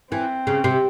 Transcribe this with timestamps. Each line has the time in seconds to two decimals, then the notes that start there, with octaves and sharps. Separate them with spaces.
0.12 E3 C4
0.47 C#3
0.64 C3